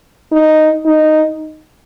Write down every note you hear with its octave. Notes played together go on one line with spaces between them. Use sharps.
D#4
D#4